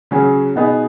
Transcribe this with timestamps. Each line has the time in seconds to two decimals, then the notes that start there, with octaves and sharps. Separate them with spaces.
0.11 C#3 F#3 C#4 G#4
0.55 B2 B3 D#4 G#4